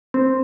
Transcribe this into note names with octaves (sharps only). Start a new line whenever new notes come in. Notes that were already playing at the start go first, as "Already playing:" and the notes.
C4